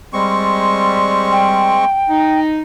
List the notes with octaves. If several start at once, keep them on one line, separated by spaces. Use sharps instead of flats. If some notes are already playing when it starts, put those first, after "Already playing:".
G3 G#3 C4 C#6
G5
D#4